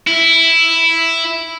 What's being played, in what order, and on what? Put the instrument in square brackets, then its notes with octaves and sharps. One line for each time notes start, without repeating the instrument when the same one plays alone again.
[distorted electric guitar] E4